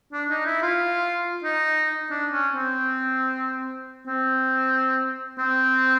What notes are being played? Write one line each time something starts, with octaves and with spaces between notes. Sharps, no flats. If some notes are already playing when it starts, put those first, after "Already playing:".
D4
D#4
E4
F4
D#4
D4
C#4
C4
C4
C4